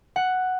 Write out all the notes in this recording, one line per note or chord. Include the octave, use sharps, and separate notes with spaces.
F#5